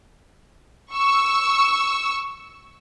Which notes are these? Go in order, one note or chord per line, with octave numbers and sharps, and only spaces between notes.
C#6 E6